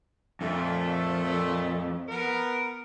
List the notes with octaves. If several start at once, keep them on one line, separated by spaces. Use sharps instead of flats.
F2 A#2 A3
B3 A#4